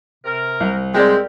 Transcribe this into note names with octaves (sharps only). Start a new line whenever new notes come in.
C3 A#4
C2
G#3 C4 G4 A#4 D5